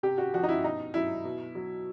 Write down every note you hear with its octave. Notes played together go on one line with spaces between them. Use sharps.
C3 G4
F#4
F3 F#4
D#4
E4
B2 D#4
F#3 E4
B2
F#3